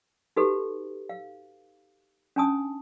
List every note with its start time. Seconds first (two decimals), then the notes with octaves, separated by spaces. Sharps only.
0.37 D#4 F#4 G4 A4 B4
1.09 F5
2.36 C#4 D4 G#5 A5 D#6